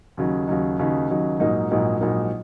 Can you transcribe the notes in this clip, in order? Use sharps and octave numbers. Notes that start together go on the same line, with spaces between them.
D#2 C#3 F#3 D#4
D#2 C#3 F#3 D#4
D#2 C#3 F#3 D#4
D#2 C#3 F#3 D#4
A#1 G#2 F#3 A#3 D#4
A#1 G#2 F#3 A#3 D#4
A#1 G#2 F#3 A#3 D#4